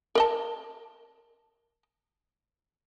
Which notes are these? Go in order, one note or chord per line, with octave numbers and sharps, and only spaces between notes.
A#4 D#5 A5